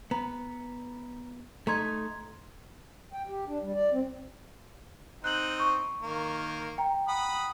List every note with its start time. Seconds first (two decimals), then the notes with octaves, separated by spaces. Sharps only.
0.11 B3 A#5
1.67 A3 D#4 A#5 C6 G#6
3.13 G5
3.27 G4
3.48 D4
3.62 G3
3.74 D5
3.92 C4
5.24 C4 D#4 F#6 F#7
5.60 C#6
6.02 D#3 A#3
6.78 G5 A#5
7.08 F#5 B5 D#6